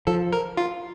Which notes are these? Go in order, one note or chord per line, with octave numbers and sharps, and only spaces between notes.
F3 A4
A#4
F4